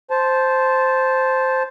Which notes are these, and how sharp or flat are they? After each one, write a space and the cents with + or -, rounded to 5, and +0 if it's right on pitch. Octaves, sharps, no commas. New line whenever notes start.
C5 +0 A5 -10